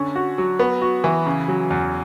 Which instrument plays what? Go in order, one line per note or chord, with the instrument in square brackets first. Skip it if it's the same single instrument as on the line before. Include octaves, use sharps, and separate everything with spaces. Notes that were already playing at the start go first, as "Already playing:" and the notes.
Already playing: [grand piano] D3 C#4
F#4
F#3
B3
F#4
E3
C#3
F#3
E2